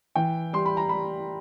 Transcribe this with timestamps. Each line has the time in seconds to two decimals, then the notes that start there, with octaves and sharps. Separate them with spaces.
0.15 E3 G5
0.53 G3 C6
0.66 B5
0.77 A#5
0.89 G3 B5